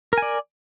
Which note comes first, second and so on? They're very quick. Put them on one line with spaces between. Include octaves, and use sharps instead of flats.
A#4 G#5 D5